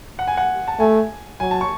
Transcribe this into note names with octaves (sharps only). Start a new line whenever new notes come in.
F#5
G#5
F#5
A5
A3 G#5
F#3 G#5
A5
C#6